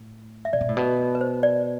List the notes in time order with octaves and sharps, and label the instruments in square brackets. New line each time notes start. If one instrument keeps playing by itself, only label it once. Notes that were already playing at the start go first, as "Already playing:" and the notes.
Already playing: [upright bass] A2
[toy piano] E5
[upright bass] C3 [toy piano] D5
[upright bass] B2
A2
B2
[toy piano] B4
C5
D5